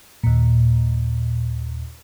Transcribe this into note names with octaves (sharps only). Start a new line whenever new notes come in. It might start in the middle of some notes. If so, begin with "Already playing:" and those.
D#2 A#2